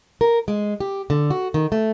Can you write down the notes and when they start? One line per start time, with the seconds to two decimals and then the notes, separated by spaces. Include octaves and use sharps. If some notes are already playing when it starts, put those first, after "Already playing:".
0.21 A#4
0.48 G#3
0.80 G4
1.10 D3
1.30 F#4
1.54 D#3
1.72 A3